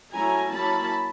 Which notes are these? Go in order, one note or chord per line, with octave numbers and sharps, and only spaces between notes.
F#3 A3 C#4 E4 G#5 A#5
F#3 A#3 C#4 E4 A5 B5